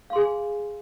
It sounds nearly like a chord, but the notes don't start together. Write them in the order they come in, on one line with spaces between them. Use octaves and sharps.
F5 C6 G#4 G#5